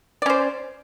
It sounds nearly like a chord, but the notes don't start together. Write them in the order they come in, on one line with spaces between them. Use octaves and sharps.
D5 C#4 C5